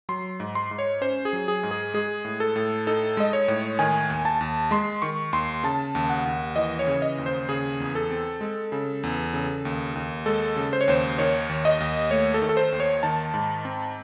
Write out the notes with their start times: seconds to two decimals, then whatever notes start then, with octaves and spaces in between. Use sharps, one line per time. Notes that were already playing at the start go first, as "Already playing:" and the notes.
0.09 F#3 C6
0.40 G#2
0.55 C6
0.71 G#2
0.79 C#5
1.01 C#4 C5
1.25 G#4
1.33 F#3
1.48 G#4
1.63 G#2
1.71 G#4
1.94 G#3 G#4
2.25 A2
2.40 A4
2.56 A2
2.87 D#4 A4
3.17 G#3 D#5
3.33 C#5
3.48 A2
3.79 D#3 G#5
4.10 D#2
4.25 A5
4.41 D#2
4.71 G#3 C6
5.02 D#3 C#6
5.33 D#2 C6
5.63 C#3 A5
5.95 D#2
6.10 F#5
6.26 D#2
6.56 E3 D#5
6.79 C#5
6.87 C#3
7.02 D#5
7.18 D#2
7.26 C5
7.49 C#3 G#4
7.80 E2
7.95 A4
8.10 C4
8.41 G#3
8.72 C#3
9.03 E2
9.33 C#3
9.65 D#2
9.95 D#2
10.26 G#3 A4
10.56 C#3
10.73 C5
10.81 C#5
10.88 D#2 C5
11.19 D#3 C#5
11.49 D#2
11.65 D#5
11.80 D#2
12.11 A3 C#5
12.34 A4
12.42 D#3
12.49 A4
12.57 C5
12.72 D#2
12.80 C#5
13.03 D#3 A5
13.34 G#2
13.65 C4